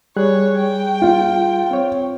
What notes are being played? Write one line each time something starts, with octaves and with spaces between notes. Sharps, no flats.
G3 G#4 C#5 F#6
G5
F4
C4 C#5